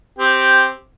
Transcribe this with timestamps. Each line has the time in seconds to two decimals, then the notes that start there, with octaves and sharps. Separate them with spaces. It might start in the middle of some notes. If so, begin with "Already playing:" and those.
0.19 C4 G4